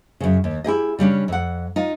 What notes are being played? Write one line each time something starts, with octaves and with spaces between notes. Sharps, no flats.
F#2 C#3
D#2
E4 G4 G#4 D#5
C#3 G3 C#4 D4
F2 F#5
D#4 F4